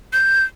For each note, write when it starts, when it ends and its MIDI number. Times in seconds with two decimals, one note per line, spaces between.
0.13 0.43 91